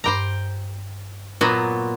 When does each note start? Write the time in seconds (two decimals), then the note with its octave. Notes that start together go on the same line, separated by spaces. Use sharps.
0.04 G2 C5 G5 A#5 D6 A#6
1.41 A#2 F#3 B3 F#4